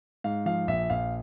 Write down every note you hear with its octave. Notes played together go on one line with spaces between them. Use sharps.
G#2 F5
F3 F5
A#1 E5
A#1 F5